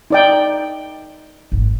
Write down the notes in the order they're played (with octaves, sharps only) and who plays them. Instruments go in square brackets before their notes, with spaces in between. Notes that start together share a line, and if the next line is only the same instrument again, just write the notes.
[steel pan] D#4 D5 G5
[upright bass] G#1 F#2